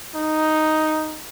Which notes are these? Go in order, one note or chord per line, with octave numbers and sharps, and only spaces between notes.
D#4